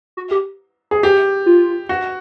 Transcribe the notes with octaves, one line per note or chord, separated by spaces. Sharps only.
F#4
G4
G#4
G4
F4
F#4